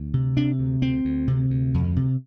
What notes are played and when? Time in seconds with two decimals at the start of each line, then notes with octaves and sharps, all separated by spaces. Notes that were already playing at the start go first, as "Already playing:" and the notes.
Already playing: D2
0.14 C3
0.37 C3 D4
0.59 D2
0.82 D2 C4
1.05 D2
1.28 C3
1.50 D2
1.74 F2
1.96 C3